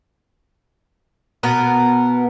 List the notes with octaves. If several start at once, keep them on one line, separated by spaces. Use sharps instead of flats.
B2 B3 A#4